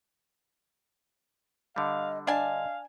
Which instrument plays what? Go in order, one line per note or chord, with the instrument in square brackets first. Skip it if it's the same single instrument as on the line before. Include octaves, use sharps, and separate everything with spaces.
[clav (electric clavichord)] D3 G3 [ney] D#5 [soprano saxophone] F5
[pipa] D4 G#5 A5 [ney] D#5 [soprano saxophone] F5